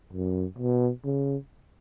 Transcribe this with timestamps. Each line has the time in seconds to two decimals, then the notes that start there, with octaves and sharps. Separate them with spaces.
0.13 F#2
0.58 B2
1.04 C#3